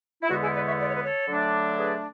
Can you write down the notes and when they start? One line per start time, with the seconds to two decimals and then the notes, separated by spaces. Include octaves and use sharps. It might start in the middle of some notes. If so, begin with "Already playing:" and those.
0.22 E4
0.29 E2 D3 G#3 B3 F#4
0.42 E4 G#4
0.54 B4 D5
0.66 C#5 E5
0.79 D5
0.87 C#5
0.95 B4
1.03 A4 C#5
1.28 D3 F#3 A3 D4
1.77 G#4 B4